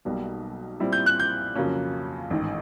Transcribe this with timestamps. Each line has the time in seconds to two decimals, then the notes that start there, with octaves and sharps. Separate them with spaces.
0.05 B1 B2 G3 A#3
0.80 A#2 G3 C4 E4
0.93 G6
1.06 F#6
1.20 G6
1.56 F2 C#3 F#3 A#3 C#4
2.30 A1 G#2 D#3